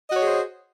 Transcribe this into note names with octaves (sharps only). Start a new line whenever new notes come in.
F#4 G#4 C5 C#5 D#5